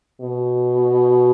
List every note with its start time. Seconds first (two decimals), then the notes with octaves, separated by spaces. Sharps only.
0.21 B2